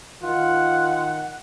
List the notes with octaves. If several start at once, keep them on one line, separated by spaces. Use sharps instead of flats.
D#3 F4 F#5